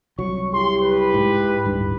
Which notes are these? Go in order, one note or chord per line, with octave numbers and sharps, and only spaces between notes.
C2 F#3 C#6
E4 G4 C6
B4
G#2
D1 G2